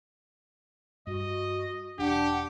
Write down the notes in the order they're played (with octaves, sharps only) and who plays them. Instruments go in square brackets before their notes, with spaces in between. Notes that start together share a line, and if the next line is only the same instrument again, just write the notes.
[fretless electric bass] G2 [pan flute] F#4 [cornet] D#5
[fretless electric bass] E1 [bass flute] D4 [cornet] G4 [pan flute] F#5